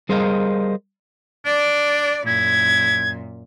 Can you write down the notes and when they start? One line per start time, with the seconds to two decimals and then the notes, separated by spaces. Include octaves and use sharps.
0.09 G3 G#4 A#4 C5 D#5 F5
1.45 D4 D5
2.27 F#2 A#2 E4 G#6